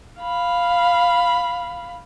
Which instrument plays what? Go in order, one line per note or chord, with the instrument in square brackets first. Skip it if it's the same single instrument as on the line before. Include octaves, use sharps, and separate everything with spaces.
[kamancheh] F5 B5